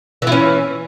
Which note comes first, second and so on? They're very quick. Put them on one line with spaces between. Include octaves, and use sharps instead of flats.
E3 E4 C#4